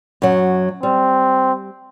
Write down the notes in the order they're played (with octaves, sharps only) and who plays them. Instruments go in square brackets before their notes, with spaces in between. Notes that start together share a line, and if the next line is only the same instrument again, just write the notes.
[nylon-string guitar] F#2 F#3
[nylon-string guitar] G3 [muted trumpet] C4